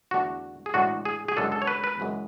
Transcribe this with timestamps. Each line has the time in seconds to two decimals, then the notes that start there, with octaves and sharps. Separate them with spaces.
0.11 E2 D3 A3 D4 F#4
0.66 G#4
0.74 A2 E3 G#3 D4 F#4
1.05 G#4
1.28 G#4
1.37 F#2 C#3 G#3 D4 A4
1.52 A4
1.62 C#5
1.67 B4
1.84 B4
2.00 F#2 C#3 E3 G#3